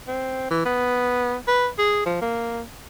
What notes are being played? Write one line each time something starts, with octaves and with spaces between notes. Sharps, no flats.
C4
E3
B3
B4
G#4
F3
A#3